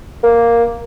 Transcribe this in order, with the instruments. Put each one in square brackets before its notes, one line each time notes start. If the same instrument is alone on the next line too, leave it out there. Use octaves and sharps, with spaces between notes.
[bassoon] A#3